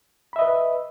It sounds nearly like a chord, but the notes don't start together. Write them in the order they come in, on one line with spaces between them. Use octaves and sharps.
B5 E5 D#5 B4